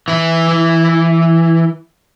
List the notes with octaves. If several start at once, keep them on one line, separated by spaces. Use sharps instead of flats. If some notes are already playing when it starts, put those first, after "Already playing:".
E3 E4